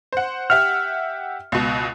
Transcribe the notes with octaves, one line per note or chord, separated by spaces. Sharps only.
C5 F#5
G4 E5 F#5 F6
C#2 B2